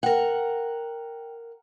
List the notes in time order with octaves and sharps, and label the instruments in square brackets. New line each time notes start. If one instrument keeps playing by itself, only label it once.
[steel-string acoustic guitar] A#4 F#5 [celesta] G5